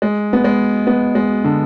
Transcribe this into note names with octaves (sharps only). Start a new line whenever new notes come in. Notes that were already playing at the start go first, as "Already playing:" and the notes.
G#3
B3
G#3
B3
G#3
D3